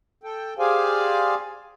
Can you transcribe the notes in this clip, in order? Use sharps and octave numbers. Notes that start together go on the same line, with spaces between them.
A4 G5
G4 G#4 C5 D5 F5 G#5